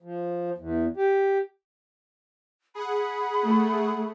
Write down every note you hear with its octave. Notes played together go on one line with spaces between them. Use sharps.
F3
E2
G4
G#4 F#5 B5
A3